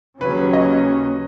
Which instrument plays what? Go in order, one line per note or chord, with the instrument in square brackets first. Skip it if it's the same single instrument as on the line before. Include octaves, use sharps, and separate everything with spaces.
[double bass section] D#2 C#3 F#3 C#4 [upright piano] B4
[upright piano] B4
D#5